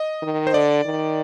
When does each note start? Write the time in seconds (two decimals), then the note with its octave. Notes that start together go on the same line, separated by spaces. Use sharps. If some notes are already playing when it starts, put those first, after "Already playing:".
Already playing: D#5
0.22 D#3
0.47 C5
0.54 D3 D5
0.85 D#3